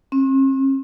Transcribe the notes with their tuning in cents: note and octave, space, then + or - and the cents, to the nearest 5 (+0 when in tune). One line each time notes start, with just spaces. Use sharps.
C4 +45